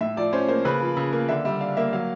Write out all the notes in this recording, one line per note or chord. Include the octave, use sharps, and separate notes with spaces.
A2 E5
F3 D5
C#4 C5
A#3 C5
C#3 B4
F3
C#3
A#3
D3 E5
G3 E5
D4 F5
A#3 E5
F#3 F5